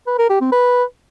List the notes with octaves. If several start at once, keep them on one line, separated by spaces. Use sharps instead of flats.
B4
A#4
G4
C4
B4